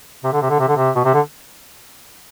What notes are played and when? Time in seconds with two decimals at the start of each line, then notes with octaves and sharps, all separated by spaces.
0.24 C3
0.33 D3
0.42 C3
0.50 D3
0.59 C3
0.68 D3
0.77 C3
0.95 B2
1.05 C3
1.14 D3